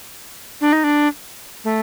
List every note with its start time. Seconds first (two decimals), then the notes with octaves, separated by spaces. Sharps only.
0.61 D4
0.73 D#4
0.84 D4
1.64 A3